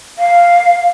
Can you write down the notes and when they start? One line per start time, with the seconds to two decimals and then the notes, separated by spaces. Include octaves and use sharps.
0.19 F5